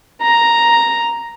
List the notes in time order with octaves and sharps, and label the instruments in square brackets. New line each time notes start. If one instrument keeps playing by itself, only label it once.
[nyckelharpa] A#5